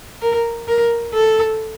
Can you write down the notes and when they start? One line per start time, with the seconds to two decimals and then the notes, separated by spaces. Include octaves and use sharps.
0.22 A#4
0.68 A#4
1.14 A4